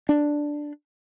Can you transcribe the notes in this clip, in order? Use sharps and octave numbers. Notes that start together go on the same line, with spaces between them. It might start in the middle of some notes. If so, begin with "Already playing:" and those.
D4